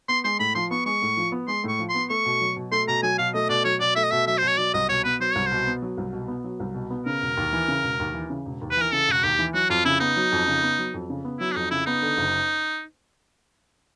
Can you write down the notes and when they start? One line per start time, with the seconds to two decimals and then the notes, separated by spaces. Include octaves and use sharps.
0.08 B3 C6
0.24 G#3 C6
0.39 A2 B5
0.55 F3 C6
0.71 B3 C#6
0.85 G#3 C#6
1.02 A2
1.17 F3
1.32 B3
1.48 G#3 C6
1.64 A2 C#6
1.79 F3
1.89 C6
1.94 B3
2.09 A3 C#6
2.25 B2
2.41 F#3
2.56 B2
2.72 A3 C6
2.88 B2 A#5
3.03 F#3 G#5
3.18 B2 F5
3.34 A3 D#5
3.49 B2 D5
3.64 F#3 C#5
3.80 B2 D5
3.96 A3 E5
4.04 D#5
4.11 B2 E5
4.27 F#3 E5
4.38 B2 C5
4.48 C#5
4.58 F#3 D5
4.74 C2 D#5
4.88 B2 C#5
5.04 B3 B4
5.20 F#3 C5
5.32 C2 C#5
5.46 C5
5.51 B2
5.67 B3
5.82 F#3
5.97 C2
6.13 B2
6.28 B3
6.44 F#3
6.60 C2
6.74 B2
6.90 B3
7.06 C#3 A#4
7.22 E1
7.37 D#2
7.53 E3
7.68 C#3
7.83 E1
7.99 D#2
8.14 E3
8.30 C#3
8.45 E1
8.61 D#2
8.71 B4
8.77 E3 A#4
8.92 C#3 A4
9.08 E1 F#4
9.23 D#2 G4
9.39 E3
9.54 F#3 F#4
9.69 F2 F4
9.85 C#3 E4
10.00 B3 D#4
10.17 F#3
10.32 F2
10.47 C#3
10.62 B3
10.78 F#3
10.94 F2
11.10 C#3
11.25 B3
11.39 F#3 E4
11.51 D4
11.55 F2 D#4
11.71 C#3 E4
11.86 B3 D#4
12.02 D3
12.17 F#1